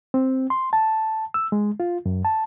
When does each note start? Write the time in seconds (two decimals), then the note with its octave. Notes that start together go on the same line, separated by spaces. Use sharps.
0.14 C4
0.50 C6
0.73 A5
1.34 E6
1.52 G#3
1.80 F4
2.06 F#2
2.25 A5